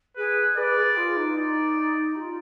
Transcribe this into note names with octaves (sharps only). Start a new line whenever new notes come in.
G#4 B4
B4 D5
G#4
F4
D#4
D5
G4
F4